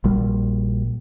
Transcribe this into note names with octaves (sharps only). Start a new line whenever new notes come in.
A#1 G3